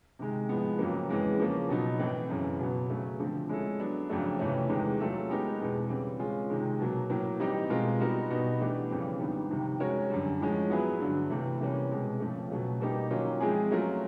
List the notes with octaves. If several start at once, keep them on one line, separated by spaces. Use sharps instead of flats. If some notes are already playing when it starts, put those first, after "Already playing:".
C3 D#3 G#3
A2 F3 G#3 B3
F2 C#3 F#3 A#3
E2 C#3 E3 G#3 C4
C#3 F3 A#3 C#4
B2 F#3 B3 D#4
A2 E3 A3 C4
F#2 C#3 E3
B2 F#3 B3
C#3 F#3 A3 C#4
D3 F3 A3 C4
G#3 C#4 E4 A4
F#3 B3 D4
F2 C#3 F#3 A3 D4
F2 C3 E3 A3 C#4
E2 C3 D#3 G#3
F#3 A3 C#4 F4 A4
G#3 B3 D#4 G4 A#4
E2 B2 G#3 C4
C#3 E3 G3 C4
G#3 C#4 F4 G#4
C3 D#3 G#3
B2 F#3 A#3
A2 F#3 A#3
E3 G3 C4 D#4 G4
B2 G#3 C4 F4 A#4
G3 B3 D#4 F#4 A#4
B2 G3 B3 D#4 F#4
E3 A3 D4 G4
F2 C#3 E3 G3 C4
G#2 D#3 G3 B3 D4
F2 C3 D#3 G3
G#3 C#4 F#4 A#4 C#5
F#2 D3 G3
A2 F3 G#3 C#4
F#3 B3 E4 G#4 B4
G2 D3 F#3
C3 E3 A3
C3 E3 G3 A#3 C#4
B2 G#3 C4
F2 C#3 F3 A3
B2 F#3 A3 C#4
B2 G3 A#3 D#4 G4
D#3 F#3 A#3 C#4 F4
F3 G#3 C4 E4 G#4
F#3 A3 C#4 F4 A#4